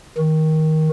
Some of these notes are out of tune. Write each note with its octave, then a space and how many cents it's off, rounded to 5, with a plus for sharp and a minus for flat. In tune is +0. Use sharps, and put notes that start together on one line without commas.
D#3 +15